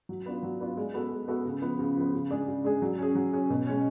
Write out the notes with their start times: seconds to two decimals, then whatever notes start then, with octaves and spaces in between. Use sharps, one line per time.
0.09 F#3
0.26 B3 D4 F4
0.43 F#3
0.60 B3 D4 F4
0.77 G#3
0.94 B3 F#4 A4
1.11 G#3
1.28 B3 F#4 A4
1.45 C#3
1.62 F3 B3
1.79 C#3
1.96 F3 B3
2.14 C#3
2.30 G#3 D4 G#4
2.48 C#3
2.64 G#3 D4 G#4
2.82 F#3
2.98 C#4 G#4
3.15 F#3
3.33 C#4 G#4
3.50 B2
3.67 G#3 C#4